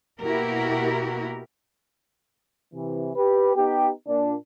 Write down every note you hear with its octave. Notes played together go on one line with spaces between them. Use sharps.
B2 A#3 E4 F#4 G4 A#4
C3 E3
G4 B4
B3 D#4 G4
A#2 D4